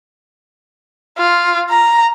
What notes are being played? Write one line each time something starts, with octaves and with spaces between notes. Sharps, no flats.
F4
A#5